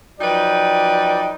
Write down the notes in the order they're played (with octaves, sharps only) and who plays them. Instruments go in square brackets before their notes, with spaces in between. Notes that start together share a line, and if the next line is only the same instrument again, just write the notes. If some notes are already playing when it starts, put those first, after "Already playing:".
[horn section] F3 F#3 D#4 B4 D5 G5